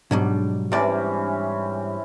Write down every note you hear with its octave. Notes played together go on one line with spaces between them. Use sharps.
G#2 B2 F#3 G3 D4
C3 E3 G3 C#4 D5